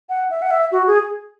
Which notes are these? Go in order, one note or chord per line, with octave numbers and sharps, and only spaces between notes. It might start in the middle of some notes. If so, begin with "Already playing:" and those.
F#5
E5
F#5
E5
F#4
G#4